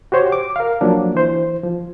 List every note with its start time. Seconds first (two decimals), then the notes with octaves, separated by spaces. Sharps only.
0.12 F#4 G4 C5 C#5
0.32 D6
0.56 A#4 F5
0.81 F3 F#3 A#3 D4
1.15 E3 C5
1.64 F3